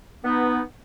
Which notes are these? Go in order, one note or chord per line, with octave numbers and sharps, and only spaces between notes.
B3 D#4